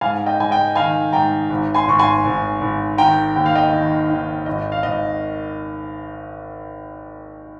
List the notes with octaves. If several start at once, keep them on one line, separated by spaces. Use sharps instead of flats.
G#2 F5 G#5
D#5 G5
G#2 G#5
D#5 G5
D#3 F5 G#5
G#2 G5 A#5
G#1
G#5 C6
G#1 C#6
G#5 C6
G#1
G#1
D#3 G5 A#5
D#2 G5
F5
D#5 G5
D#3
D#3
G#1 D#5
F5
G#1 D#5